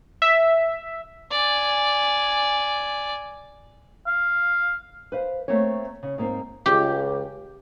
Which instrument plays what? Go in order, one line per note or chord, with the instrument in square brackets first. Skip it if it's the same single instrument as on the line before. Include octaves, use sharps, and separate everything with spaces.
[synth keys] E5
[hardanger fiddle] D5 G#5
[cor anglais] F5
[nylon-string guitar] B4 C5 F5
A3 A#3 C4 C#5
C#3
G#2 A#3 C4
[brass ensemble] C#2 [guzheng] G4